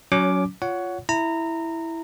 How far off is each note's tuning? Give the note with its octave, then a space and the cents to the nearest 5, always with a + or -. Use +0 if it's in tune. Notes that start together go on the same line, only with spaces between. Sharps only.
F#3 +0 C#4 +25 D6 +0
F4 +0 C#5 +20 F#5 +0
E4 +0 A#5 -20